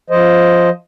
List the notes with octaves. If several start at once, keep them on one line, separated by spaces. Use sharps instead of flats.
F3 C5 D#5